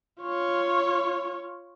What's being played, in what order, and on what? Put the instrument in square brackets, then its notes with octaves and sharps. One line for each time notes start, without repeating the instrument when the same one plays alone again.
[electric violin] F4 C#5